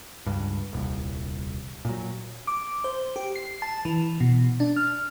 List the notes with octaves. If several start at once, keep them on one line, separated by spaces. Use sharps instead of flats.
C#2 G2
D#1 C2
A#2 F#3
D6
C5
G4
C7
A5
E3
B2
D4
F6